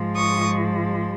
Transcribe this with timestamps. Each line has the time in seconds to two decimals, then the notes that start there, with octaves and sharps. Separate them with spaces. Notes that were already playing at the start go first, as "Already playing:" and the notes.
Already playing: G#2 F3 G#3
0.16 C#6 D#6